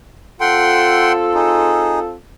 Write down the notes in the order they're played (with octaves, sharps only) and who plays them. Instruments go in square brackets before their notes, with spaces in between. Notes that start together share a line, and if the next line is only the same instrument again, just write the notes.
[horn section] C4 F4 A4 [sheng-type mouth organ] F#5 G5 C6
[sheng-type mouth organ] D#4 G#4